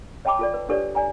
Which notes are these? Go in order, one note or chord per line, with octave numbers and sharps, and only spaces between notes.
C#5 D#5 G5 A5 B5 D6
F4 A4 D5
B4
D4 G4 A4 B4 C#5 D5
D5 G#5 A#5